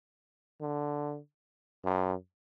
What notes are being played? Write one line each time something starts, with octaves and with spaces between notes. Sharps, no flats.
D3
F#2